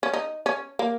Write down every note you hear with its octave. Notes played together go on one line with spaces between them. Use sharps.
C#4
D#4
C#4
A#3